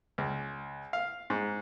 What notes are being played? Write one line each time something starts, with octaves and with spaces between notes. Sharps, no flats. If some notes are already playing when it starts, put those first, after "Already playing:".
C#2
F5
G#2